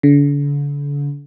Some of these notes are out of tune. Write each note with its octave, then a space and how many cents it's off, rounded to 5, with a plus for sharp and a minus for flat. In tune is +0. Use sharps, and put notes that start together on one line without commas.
D3 -40